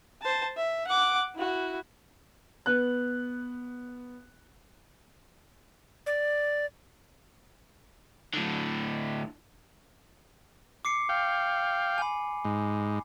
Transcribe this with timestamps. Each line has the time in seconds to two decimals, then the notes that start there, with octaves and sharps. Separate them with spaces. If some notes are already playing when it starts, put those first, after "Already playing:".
0.22 C5 A5
0.57 E5
0.87 F#5 D6
1.35 E4 F#4
2.66 B3 F#6
6.06 D5
8.33 A2 D3
10.85 D6 C7 C#7
11.09 F5 G5
11.98 G#5 B5
12.45 G#2